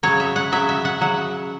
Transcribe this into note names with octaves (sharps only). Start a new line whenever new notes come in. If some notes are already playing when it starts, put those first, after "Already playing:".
C#3 F#3 C#5
E5
F#5
C#3 F#3 E5
E5
F#5
C#3 F#3 F#5